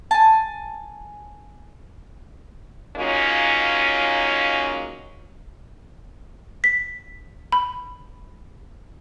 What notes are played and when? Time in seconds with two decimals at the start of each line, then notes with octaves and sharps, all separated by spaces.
0.11 G#5 A5
2.97 F#3 G#3 A#3 C#4 D#4 F4
6.64 B6
7.52 B5